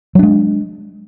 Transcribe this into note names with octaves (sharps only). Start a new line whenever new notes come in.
F#3 G#3 D4